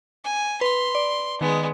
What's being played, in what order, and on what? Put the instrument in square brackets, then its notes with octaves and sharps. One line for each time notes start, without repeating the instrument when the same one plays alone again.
[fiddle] G#5
[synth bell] B4 B5 [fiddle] C6
[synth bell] D5
[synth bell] D#3 [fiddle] G#3 B3